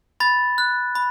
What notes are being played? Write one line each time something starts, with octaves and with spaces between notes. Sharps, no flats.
B5 A6
F#6
B5